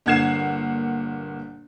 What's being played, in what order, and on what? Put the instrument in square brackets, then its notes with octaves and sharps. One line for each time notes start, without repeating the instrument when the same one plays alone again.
[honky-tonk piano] G1 A#2 F#5 G#6 C7 E7